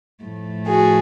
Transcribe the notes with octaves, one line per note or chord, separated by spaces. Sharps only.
A2 F3 A3
F#4 G#4